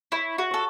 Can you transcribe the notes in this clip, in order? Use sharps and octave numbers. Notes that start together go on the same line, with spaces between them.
E4 C#5
F#4
A4 C#5